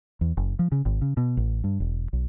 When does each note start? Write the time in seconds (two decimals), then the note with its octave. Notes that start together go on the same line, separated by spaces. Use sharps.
0.21 E2
0.37 F#1
0.59 F3
0.72 C#3
0.86 G#1
1.01 C#3
1.17 B2
1.37 A1
1.64 G2
1.80 E1
2.13 B1